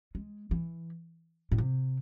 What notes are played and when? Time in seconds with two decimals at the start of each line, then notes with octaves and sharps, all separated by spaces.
0.15 G#3
0.51 E3
1.52 A2
1.58 C3